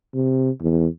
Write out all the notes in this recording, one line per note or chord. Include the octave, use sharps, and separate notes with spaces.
C3
E2